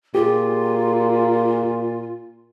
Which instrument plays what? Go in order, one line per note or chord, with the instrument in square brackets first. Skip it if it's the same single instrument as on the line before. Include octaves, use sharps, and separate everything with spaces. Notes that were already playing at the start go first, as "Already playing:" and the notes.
[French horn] A#2 [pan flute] F4 [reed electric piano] G4 G#4